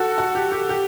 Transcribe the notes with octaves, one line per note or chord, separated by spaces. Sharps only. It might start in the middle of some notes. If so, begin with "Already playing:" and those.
Already playing: F#4 A4
F#4
G4
G4
G4